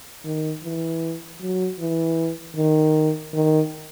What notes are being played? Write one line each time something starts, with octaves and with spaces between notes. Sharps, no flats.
D#3
E3
F#3
E3
D#3
D#3